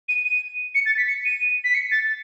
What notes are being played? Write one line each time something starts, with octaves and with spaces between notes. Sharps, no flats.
D#7
D#7
C#7
A6
B6
C#7
D#7
B6
C#7
A6